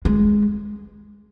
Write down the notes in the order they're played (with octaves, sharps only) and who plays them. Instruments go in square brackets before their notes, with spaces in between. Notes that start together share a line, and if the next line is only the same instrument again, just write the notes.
[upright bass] G#3